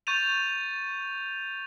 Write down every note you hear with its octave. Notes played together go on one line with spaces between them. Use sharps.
C#6 G6 A6 D#7 F7